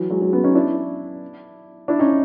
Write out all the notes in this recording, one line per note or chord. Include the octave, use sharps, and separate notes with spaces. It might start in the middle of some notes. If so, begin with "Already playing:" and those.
Already playing: E3 F#3
F#3 G#3
F#3 G#3
B3 C#4
C#4 D#4
D4 E4
D4 E4
C#4 D#4